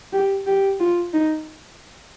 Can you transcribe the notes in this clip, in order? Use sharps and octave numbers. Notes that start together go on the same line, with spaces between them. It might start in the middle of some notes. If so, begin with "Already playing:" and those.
G4
G4
F4
D#4